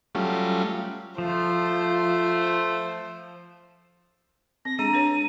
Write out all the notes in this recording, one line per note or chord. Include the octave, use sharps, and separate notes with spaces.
F#3 G3 A3 C#4 F4
F3 A3 F4 C5
C4 A#6
G#3 D4 G#4 A#5 D#7
D4 B4 C#5